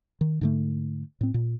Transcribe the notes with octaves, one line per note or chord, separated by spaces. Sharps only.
D#3
G#2 D3 A3
A2 C4
A#2